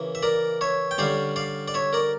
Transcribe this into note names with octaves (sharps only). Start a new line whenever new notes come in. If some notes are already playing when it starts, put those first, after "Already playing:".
Already playing: C#3 E3 A#3
E5
A#4 D5
C#5 E5
G5
D3 G3 C#4 D5 F5
D5 F5
D5
C#5 E5
A#4 D5